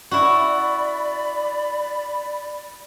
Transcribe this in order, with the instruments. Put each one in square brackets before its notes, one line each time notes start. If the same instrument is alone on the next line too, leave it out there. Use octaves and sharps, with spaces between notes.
[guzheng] E4 F#4 [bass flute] D5 [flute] B5